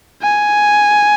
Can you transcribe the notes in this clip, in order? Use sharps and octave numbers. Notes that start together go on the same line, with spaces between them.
G#5